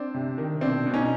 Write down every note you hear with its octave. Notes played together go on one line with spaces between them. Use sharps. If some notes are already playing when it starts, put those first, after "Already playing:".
Already playing: C4 D4
C3
D#3
B2 C4 D4
B2
C#4 D#4